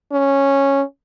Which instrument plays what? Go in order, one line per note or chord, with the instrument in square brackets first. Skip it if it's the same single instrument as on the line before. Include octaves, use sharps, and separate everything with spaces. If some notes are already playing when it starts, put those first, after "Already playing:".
[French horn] C#4